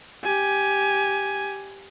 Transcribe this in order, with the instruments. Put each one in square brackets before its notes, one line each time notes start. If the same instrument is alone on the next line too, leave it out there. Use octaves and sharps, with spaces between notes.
[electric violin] G4 G#5